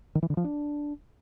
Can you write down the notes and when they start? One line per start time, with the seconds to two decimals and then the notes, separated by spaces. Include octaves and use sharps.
0.15 D#3
0.23 E3
0.30 D3
0.37 F3
0.44 D4